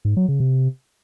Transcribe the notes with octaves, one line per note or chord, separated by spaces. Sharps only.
G#2
F#3
C#3
C3